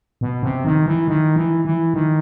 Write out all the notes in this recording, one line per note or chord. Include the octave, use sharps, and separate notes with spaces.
B2
C3
D#3
E3
D#3
E3
E3
D#3